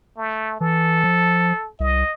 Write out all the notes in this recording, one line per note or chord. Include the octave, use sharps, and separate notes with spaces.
A3
E3 A4
F3
C2 D#5